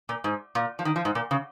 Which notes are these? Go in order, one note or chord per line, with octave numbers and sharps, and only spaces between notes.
A#2
G#2
A#2
F3
D#3
F3
G#2
A#2
C#3